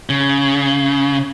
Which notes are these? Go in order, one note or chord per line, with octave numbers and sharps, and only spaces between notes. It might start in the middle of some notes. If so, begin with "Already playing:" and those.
C#3